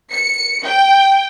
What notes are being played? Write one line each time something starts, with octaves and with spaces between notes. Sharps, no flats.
C#7
G5